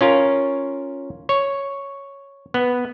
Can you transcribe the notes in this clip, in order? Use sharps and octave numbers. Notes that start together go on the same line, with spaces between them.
C#4 F4 A#4 C#5
C#5
B3